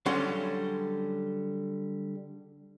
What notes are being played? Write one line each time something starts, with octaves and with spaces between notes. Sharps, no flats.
D3 F#3 G3 C#4 F5 C6